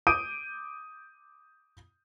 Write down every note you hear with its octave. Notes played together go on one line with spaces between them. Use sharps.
D6 D#6 G6 D7 D#7